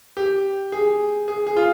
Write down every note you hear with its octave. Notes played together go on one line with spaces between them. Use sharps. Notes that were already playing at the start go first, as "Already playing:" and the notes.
G4
G#4
G#4
G#4
F4